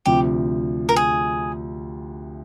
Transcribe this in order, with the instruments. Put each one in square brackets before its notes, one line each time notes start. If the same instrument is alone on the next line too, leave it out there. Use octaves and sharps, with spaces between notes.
[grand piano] D2 C3 F3 [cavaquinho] G4
[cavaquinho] A#4
G#4